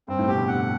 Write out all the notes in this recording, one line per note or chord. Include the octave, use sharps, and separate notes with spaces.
G2 C4
A2
B2 G4
D3
F#5